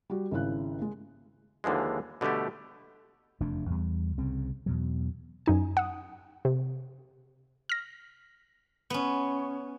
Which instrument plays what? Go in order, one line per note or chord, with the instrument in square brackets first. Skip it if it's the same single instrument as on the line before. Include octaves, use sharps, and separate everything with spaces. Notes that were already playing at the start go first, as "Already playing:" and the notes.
[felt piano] G3 F#4
G#1 C#3 E4 F#6
G#3
[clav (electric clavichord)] D#2 D3 E3 F3 G#3
B2 D3 G3 A3 G4
[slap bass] F1 E2 A3 D4
E2 G3
C2 C#3 C4
E2 B2 F#3
[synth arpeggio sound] F#2 D#4 G#5
F#5 D#6
C3
F6 A#6
[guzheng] B3 C#4